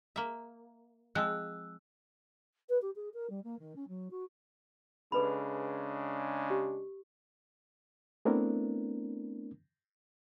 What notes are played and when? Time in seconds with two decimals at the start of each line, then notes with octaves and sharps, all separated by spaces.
0.16 A#3 E5
1.15 F3 G#3 C4 E6 F#6
2.69 B4
2.81 G4
2.95 G#4
3.14 A#4
3.29 G3
3.43 A#3
3.59 D#3
3.75 C#4
3.88 F#3
4.10 F#4
5.12 C#3 G#3 D4 A4 B4 B5
6.50 G4
8.25 A3 B3 C4 D4 E4 A#4